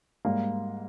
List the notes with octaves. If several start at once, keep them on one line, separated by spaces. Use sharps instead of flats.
G#2 G3 A#3